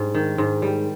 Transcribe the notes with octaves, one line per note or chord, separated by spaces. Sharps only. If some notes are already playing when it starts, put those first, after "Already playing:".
Already playing: G#2 G3
D#3
G#2
G3